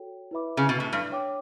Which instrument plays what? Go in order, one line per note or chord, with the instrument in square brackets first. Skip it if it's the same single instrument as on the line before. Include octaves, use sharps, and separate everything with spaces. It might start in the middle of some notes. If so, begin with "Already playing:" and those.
Already playing: [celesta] F#4 A4 C#5 G5
E4 B4 E5 B5 D6
[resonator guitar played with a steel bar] C#3
B2
A2
G2
[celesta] C#5 G5 D6